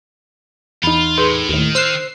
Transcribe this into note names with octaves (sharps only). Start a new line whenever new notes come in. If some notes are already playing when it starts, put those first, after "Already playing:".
E2 D#4 F4 B5
A2 G#4 B4 C6
D#2 A2 D#3
C5 E6 F#6 C7